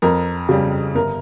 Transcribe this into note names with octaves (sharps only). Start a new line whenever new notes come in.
F2 A#4
C#3 G3
G1 A#4